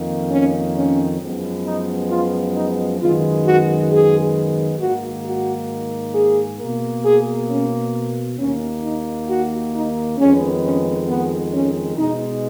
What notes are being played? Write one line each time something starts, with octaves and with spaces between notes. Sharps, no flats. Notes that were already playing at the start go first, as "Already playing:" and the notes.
Already playing: F2 D#3 A#3
C#4
C#4
F#2 F3 G#3 B3
D#4
F4
D#4
F#2 D#3 G#3 B3 F4
F#4
G#4
G#2 D#3 A#3 F#4
F#4
G#4
B2 A#3
G#4
C#4
D#2 D#3 A#3 C#4
D#4
F#4
D#4
F2 D#3 G#3 B3 C#4
C#4
B3
C#4
B2 G#3 B3 D#4